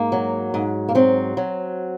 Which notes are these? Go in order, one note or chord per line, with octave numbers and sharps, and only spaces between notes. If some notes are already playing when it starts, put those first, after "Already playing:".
Already playing: G#2 A#3
F#3
G#2
A#3
F#3 C4
F#3